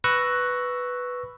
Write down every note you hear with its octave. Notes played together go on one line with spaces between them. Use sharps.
B4 C#6 E6 F#6 A#6